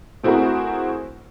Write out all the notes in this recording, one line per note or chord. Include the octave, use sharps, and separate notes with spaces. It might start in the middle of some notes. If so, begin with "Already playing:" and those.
A3 C4 E4 F#4 G#4 A#4